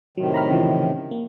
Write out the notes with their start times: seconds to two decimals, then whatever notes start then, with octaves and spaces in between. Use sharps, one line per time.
0.17 A2 C3 D#3 F#3
0.34 A#5 B5 F6
0.51 C#3 E3 F3
1.11 A#3